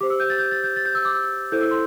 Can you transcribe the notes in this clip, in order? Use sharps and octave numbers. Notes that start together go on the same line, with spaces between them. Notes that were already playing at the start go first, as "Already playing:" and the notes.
G4 C5 D6
E6
G6
A6
G6
A6
G6
A6
G6
E6
D6
E6
E4 A4 C5 G6
E6
C6